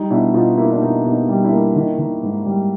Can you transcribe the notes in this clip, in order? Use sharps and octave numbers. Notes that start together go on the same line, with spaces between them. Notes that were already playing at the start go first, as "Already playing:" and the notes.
Already playing: G3 D#4
B2 D4 E4
B2 D#4 F4
A#3 E4
D#4
D4 E4
B2 D#4
B2
D#4
G3
D4 E4
A#3
D#3
D#3
G#2
G3